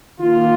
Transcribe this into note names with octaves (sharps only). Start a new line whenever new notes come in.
D#3 A#3 F4